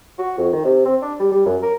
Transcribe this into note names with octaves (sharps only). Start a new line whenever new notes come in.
F#4
F2
D#3
C3
C4
D4
G3
G3
F#2
A#4